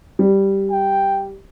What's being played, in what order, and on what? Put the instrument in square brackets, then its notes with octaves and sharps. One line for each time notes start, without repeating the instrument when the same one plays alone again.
[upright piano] G3
[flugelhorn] G5